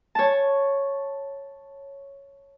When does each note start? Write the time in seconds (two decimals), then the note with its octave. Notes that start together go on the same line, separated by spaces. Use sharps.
0.15 C#5 A5